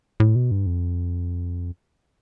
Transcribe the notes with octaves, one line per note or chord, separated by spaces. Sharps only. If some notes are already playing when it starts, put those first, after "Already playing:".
A2
B2
G2
F2